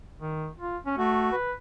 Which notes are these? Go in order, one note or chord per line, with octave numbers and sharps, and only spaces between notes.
D#3
F4
C#4
A3 F#4
B4